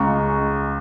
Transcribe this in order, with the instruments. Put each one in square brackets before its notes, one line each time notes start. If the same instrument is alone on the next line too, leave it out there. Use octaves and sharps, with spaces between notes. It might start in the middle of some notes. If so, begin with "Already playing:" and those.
Already playing: [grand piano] C#2 C#3 G#3 A#5 C#6